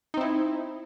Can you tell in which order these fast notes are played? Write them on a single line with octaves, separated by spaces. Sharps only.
D#4 C4 E4